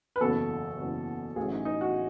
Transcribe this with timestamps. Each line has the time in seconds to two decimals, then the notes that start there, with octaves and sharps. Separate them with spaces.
0.16 B4
0.21 F#1 E2 B2 F#3 A4
0.79 F#1 E2 B2 F#3
1.36 A1 A2 F#3 G#4
1.52 D#4
1.65 D#4
1.81 F#4